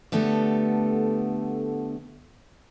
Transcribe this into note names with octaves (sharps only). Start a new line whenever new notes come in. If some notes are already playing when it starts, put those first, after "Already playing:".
D3 A3 B3 G4 A4